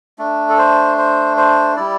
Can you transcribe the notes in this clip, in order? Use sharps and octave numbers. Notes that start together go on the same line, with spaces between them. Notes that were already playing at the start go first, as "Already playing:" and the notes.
A3 D4
A4
C5
C5
C5
G3 E4 D5